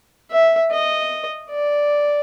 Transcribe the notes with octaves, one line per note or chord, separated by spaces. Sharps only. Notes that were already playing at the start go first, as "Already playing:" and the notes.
E5
D#5
D5